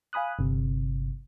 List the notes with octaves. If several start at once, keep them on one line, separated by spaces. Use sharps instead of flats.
F5 G#5 B5 D#6 F#6
G1 C3